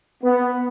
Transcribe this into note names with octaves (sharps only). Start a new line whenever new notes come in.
B3